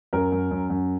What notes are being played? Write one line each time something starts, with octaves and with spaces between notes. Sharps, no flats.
F#2 A#4
F#2
F#2
F#2